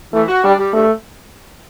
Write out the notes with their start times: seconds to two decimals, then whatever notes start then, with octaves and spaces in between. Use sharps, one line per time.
0.14 E3 A3
0.28 F#4
0.44 G3 D4
0.58 G3
0.73 G2 A3